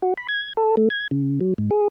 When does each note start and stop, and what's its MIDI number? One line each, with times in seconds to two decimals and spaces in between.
0.02 0.14 66
0.17 0.27 83
0.29 0.53 92
0.57 0.75 69
0.77 0.89 57
0.90 1.08 92
1.11 1.39 49
1.40 1.54 54
1.58 1.70 44
1.71 1.88 68